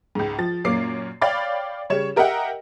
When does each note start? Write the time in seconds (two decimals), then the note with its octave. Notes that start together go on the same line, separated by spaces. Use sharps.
0.15 C#2 G#2
0.39 F3 A6
0.64 F#2 A#2 A#3 C#4 D6 C7
1.21 C#5 D5 F5 G5 B5 A6
1.90 C#3 G3 C#5 E7
2.16 G4 A#4 D#5 E5 F#5 G5